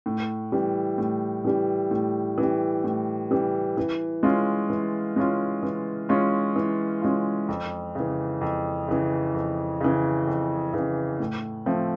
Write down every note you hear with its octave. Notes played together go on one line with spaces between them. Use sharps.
A2
E3 G3
A2
E3 G3
A2
E3 G3
A2
E3 G3
E3
G#3 C#4 F4
E3
G#3 C#4 F4
E3
G#3 C#4 F4
E3
G#3 C#4 F4
F2
C#3 E3
F2
C#3 E3
F2
C#3 E3
F2
C#3 E3
A2
F3 A3 C4